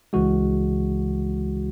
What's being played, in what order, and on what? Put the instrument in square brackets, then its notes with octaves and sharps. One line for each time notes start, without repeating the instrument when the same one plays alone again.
[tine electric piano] C#2 C#3 E3 G#3 F#4